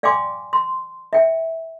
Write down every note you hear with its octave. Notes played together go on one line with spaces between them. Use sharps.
D5 F5 G5 G#5 C6 D6
C6
E5 G5